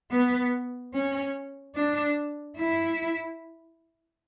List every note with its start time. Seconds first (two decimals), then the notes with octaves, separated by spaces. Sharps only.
0.11 B3
0.94 C#4
1.75 D4
2.58 E4